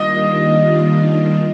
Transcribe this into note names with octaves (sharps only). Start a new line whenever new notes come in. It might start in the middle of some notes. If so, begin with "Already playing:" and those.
Already playing: D#3 G3 A#3 D4 F4 D#5